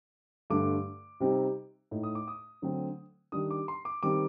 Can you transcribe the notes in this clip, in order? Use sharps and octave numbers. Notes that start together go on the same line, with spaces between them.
G2 D3 A3 D6
C3 G3 C4 D#4
A2 A3 D#4
D#6
D6
D#6
D3 F#3 A3 C4
D#3 G3 D4 D#6
D6
C6
D6
D#3 G3 C4 D6